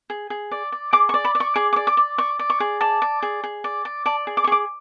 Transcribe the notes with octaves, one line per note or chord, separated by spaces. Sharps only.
G#4
G#4
D5
D5
G#4 D6
C#6
D5
B5
D5
C#6
G#4 D6
D6
D5
D6
D5
D5 C#6
D5
C#6
G#4
D5 A5
D5
G#4
G#4
D5
D5
D5 A5
G#4
D6
C#6
G#4 D6